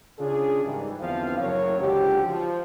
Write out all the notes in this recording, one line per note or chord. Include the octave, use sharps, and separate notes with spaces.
C#3 C#4 D4 F4 G#4
G#2 D#3 E3 G3 G#3
E2 G2 D3 F3 C4 F5
F#1 A2 F#3 A#4 C#5
C#2 G#2 D3 F3 F#4 G4
F3